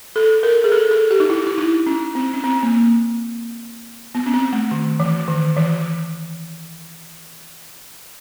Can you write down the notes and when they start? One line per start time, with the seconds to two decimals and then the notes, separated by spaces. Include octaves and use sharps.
0.16 A4
0.43 A#4
0.64 G#4
0.72 A4
0.91 A4
1.11 G4
1.20 D#4
1.30 E4
1.47 E4
1.58 D#4
1.87 C#4
2.15 C4
2.33 C#4
2.44 C4
2.63 A#3
4.15 B3
4.26 C#4
4.34 C4
4.53 A3
4.71 D#3
5.00 E3
5.28 D#3
5.57 E3